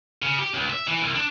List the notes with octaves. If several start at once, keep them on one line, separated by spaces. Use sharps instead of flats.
C#3
G4
C#2
E5
E3
C2
D4